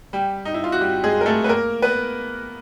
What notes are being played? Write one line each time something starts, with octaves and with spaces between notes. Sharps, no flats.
G3 G4
D#4
E4
F4
F#4
G3 G4
G#3 G#4
A#4
A3 A4
B4
A#3 A#4
B3 B4